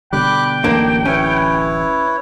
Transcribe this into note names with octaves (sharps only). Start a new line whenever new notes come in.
B2 D3 G3 G5 B5 D6 F#6
D1 A1 D3 A#3 D4 D#4
C#4 E4 B4 C#5